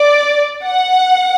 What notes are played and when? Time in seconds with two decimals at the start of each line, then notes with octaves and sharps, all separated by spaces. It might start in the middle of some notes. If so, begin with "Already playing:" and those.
Already playing: D5
0.63 F#5